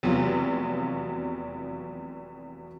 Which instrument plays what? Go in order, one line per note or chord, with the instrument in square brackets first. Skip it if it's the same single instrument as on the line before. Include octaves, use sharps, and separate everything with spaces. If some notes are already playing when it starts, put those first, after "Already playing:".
[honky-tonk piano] F1 E2 F#3 B3 F4